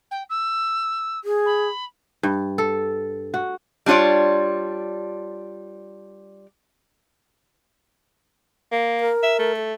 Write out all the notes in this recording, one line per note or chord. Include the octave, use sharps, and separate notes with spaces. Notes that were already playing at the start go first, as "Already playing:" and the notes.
G5
E6
G#4
B5
G2
A4
F#4
G3 D4 F4 C#5 D5
A#3
A#4
E5
A3
A4